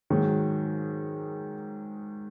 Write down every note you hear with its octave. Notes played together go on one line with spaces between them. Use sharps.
G#2 D#3 F#3